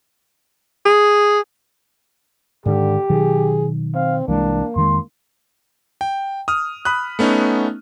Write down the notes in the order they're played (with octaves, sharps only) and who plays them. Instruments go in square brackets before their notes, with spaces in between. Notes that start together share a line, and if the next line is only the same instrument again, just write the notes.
[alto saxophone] G#4
[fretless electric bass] G#2 D#3 [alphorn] D3 [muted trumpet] G4
[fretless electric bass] B2 D#3 F#3 [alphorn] G#4
[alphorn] C4 [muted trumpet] F5
[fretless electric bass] C2 E3 G#3 [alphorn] A#3 [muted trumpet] D4
[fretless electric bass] F2 D#3 G#3 [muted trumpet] C6
[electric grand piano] G5
D#6 F6
B5 D#6 F#6
A3 B3 C#4 D#4